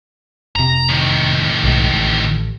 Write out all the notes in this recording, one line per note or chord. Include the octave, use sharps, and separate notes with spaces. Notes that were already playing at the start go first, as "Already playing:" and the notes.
F1 C3 A#5
A2 D#3
B1 G#2
A1